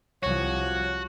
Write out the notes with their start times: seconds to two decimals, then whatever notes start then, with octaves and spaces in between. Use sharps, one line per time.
0.23 C2 F3 F#4 C#5